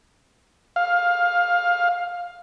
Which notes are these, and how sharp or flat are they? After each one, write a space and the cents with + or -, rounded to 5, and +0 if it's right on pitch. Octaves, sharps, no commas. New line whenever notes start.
F5 +15